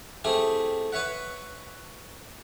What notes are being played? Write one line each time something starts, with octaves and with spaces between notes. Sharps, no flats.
A3 C4 E4 G4 G#4
B4 C#5 E5 F#5